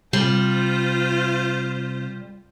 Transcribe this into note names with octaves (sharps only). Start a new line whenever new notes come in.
C3 G3 F4 C5